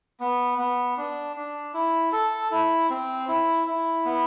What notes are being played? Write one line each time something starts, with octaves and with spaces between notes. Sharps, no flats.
B3
B3
D4
D4
E4
A4
E4
C4
E4
E4
B3